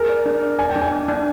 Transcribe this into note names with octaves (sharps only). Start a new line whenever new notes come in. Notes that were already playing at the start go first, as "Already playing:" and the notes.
Already playing: G#4 A#4
D5
D4
D5
D5 G#5
G5
D4
G#5
D4
D4